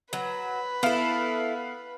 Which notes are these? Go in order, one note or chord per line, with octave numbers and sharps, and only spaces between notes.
F#3 B4
B3 E4 A4 F5